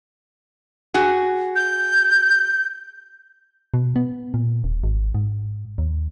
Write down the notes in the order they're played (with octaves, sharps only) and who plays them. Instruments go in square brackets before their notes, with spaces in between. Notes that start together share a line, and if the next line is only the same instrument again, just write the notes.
[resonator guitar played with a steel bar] F#4 G#4
[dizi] G6
[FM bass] B2
B3
A#2
D#1
G#1
G#2
D#2